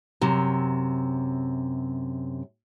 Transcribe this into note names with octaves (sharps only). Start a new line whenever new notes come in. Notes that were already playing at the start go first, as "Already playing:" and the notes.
F#2 C3